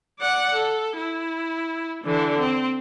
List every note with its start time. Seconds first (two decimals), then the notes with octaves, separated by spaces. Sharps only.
0.19 D5 F#5
0.53 A4
0.98 E4
2.04 D3 E3
2.39 C4